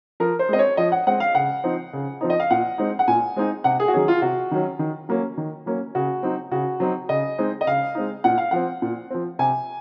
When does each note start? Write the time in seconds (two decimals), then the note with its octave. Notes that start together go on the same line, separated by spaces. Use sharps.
0.20 F3 A#4
0.39 C5
0.49 G#3 C4 D#5
0.59 C#5
0.77 F3 D#5
0.92 F#5
1.07 G#3 C4 F#5
1.20 F5
1.35 C#3 F#5
1.64 F3 C4 D#4
1.93 C#3
2.21 F3 C4 D#4
2.30 D#5
2.40 F5
2.51 A#2 F#5
2.78 G#3 C4 D#4
2.99 F#5
3.08 A#2 G#5
3.36 G#3 C4 D#4
3.64 C3 F#5
3.80 G#4
3.88 F#4
3.94 D#3 F#3 C#4 G#4
4.08 F4
4.22 C3 F#4
4.51 D#3 F#3 C#4
4.79 D#3
5.09 F#3 A#3 C#4
5.37 D#3
5.66 F#3 A#3 C#4
5.95 C#3 F#4
6.23 F#3 C4 D#4
6.51 C#3 F#4
6.80 F#3 C4 D#4
7.09 C#3 D#5
7.38 G#3 C4 D#4
7.61 D#5
7.67 C#3 F5
7.95 G#3 C4 D#4
8.24 A#2 F#5
8.38 F5
8.51 F3 C4 F#5
8.82 A#2
9.10 F3 C4
9.39 C3 G#5